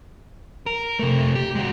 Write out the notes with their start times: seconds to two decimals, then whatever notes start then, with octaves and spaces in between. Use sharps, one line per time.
0.66 A#4
0.99 C3 A3
1.35 G4
1.55 G#3 F#4